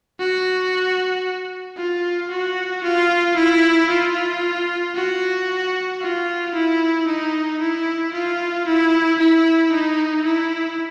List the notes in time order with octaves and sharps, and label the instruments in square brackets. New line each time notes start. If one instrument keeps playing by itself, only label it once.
[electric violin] F#4
F4
F#4
F4
E4
F4
F#4
F4
E4
D#4
E4
F4
E4
E4
D#4
E4